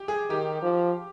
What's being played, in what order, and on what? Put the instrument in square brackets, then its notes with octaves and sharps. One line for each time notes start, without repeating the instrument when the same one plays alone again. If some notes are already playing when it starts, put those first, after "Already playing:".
Already playing: [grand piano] G4
G#4
[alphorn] D#3 [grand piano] G4
[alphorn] F3